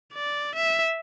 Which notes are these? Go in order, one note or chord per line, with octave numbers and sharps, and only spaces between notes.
D5
E5